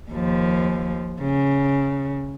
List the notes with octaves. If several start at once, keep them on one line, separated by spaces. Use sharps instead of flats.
D#2 F3
C#3